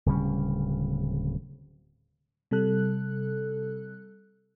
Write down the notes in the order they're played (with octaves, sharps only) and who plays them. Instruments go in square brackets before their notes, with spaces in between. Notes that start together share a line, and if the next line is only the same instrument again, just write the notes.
[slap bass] D1 C#3 G3 C#4
[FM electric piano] C3 G3 A4 F#6